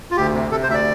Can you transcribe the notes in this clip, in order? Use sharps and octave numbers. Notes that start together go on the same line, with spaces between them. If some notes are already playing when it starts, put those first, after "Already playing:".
F4
D2 G4
C3
C3 A4
C5
D2 E5
D5